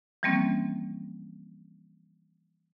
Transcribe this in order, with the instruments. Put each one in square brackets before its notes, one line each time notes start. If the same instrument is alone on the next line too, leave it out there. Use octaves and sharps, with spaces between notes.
[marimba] E3 F3 G3 A#3 C4 C#4